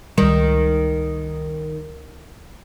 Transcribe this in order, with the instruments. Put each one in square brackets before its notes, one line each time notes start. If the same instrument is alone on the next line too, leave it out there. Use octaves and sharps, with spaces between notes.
[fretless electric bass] C#2 G3 [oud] D#3